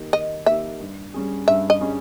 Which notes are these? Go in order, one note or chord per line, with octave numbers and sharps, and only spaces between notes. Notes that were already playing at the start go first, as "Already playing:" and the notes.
Already playing: D#3 A#3 D#4 G4
D#3 D#5
A#3 D#4 G4 E5
G2
G3 C#4 G#4
G2 E5
D#5
G3 C#4 G#4